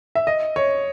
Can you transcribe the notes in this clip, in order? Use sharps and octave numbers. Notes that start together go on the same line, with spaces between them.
E5
D#5
C#5